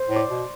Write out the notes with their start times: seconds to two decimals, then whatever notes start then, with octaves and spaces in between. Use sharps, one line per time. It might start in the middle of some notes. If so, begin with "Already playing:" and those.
Already playing: C5
0.09 A2
0.16 D5
0.30 B2